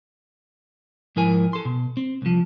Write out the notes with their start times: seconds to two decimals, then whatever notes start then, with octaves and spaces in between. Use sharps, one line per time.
1.16 G#2 F3 E4 A#4 G#5
1.53 A4 C6
1.65 B2
1.97 C4
2.22 C2 F3